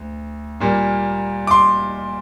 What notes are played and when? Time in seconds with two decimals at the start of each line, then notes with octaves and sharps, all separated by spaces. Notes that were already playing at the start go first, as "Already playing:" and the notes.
Already playing: D2
0.60 A#2 G3 A#3
1.47 D6
1.51 C6